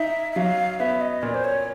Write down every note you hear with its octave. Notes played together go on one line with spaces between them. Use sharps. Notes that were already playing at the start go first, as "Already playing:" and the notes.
Already playing: D#4 E5
E5
F#3 F5
B3 E5
D#5
A#2 D5
C5
C#5